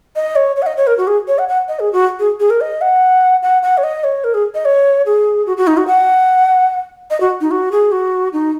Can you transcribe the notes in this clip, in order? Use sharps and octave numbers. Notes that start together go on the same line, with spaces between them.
D#5
C#5
C#5
F#5
D#5
C#5
A#4
F#4
G#4
C#5
F#5
F#5
D#5
G#4
F#4
G#4
G#4
A#4
D#5
F#5
F#5
F#5
C#5
D#5
C#5
A#4
G#4
D#5
C#5
G#4
F#4
F#4
D#4
F#4
F#5
D#5
F#4
D#4
F#4
G#4
F#4
D#4